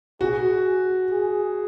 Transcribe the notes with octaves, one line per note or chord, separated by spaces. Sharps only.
F#4 G#4
G#4